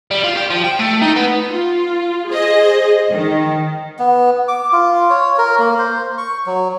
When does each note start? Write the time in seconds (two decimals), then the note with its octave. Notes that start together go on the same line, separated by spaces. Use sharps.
0.11 G3
0.24 F4
0.35 G4
0.50 F3
0.64 G5
0.79 A3
1.02 D#4
1.16 B3
1.50 F4
2.29 G#4 C5 D#5
3.11 D#3
3.99 B3
4.48 D6
4.73 F4
5.10 C#5
5.38 A#4
5.59 A#3
5.79 C5
6.18 C#6
6.46 F#3